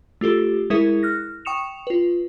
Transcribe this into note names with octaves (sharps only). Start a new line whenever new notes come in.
A3 F4 G4 A4
G#3 E4 G#4 A#4 E5 C#7
F6 F#6 A#6
G5 C#6 D#6 C#7 E7 F7
F4 B4